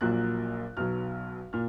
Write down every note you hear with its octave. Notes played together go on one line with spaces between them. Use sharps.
A#1 A#2 F#3 A#3 F#6
B1 B2 F#3 F6
A#2 F6